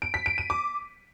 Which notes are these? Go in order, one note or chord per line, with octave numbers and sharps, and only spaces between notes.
D7
B6
D7
D#7
D6